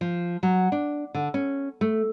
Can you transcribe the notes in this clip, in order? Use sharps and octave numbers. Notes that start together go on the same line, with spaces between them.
F3
F#3
D4
D3
C#4
A3